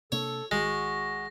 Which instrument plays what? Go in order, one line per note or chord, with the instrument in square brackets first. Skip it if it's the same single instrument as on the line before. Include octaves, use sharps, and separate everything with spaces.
[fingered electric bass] C3 A#3 D4 [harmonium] A4 [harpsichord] C#5
[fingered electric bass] G#1 D#3 [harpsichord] G#3 [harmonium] F#4 [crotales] A#6